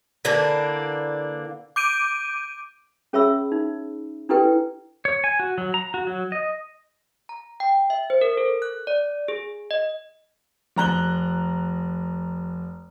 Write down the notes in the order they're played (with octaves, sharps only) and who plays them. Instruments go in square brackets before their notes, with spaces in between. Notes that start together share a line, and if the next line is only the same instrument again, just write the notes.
[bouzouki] D3 E3 A#3 D4
[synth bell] D6 G6 D7 D#7
[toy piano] C#4 G#4 C#5 E5 B5 E6
D#4
D4 E4 G4 A4 B4 G5
[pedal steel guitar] C#5
G#5
F#4
F#3
A#5
F#4
F#3
D#5
[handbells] A#5
G5
E5
C5
A#4
A4
F#6
D5
G#4
D#5
[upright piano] F1 A#5 F#6 G7